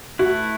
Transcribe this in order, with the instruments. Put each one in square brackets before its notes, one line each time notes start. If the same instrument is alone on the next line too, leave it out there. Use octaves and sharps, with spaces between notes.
[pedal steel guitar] A3 E4 B4 [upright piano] F#4